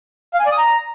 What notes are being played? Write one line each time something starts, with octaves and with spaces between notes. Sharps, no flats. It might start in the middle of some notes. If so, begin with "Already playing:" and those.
F5
G#5
D5
D#6
A#5